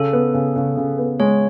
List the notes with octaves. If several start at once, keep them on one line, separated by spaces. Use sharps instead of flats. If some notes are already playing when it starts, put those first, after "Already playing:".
Already playing: C#3 A4
B3
C#3
C#3
C#3
B3
G#3 C#5